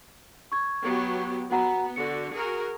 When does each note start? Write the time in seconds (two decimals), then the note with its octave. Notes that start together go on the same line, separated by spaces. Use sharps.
0.52 C#6 G#6
0.82 F#3 B3 G4
1.51 B3 F#4 F#5 A#5
1.96 D3 F#4 C#7
2.34 F#4 G#4 A#4